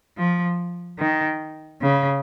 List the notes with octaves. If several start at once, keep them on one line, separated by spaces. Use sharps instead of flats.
F3
D#3
C#3